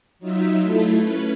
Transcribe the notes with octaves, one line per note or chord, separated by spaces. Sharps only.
F#3 D#4 F4 E5
A3 E4 F4 A4
C#4 B4